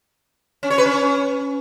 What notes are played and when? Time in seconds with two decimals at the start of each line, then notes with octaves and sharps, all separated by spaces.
0.63 C#4
0.70 C#5
0.78 B4
0.86 C#4